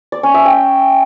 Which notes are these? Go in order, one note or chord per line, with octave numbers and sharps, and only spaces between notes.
D5
C#4
E5
G5